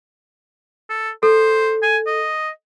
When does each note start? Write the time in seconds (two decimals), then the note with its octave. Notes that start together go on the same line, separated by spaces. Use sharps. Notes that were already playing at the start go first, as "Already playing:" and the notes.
0.89 A4
1.23 A4 C5
1.83 G#5
2.07 D#5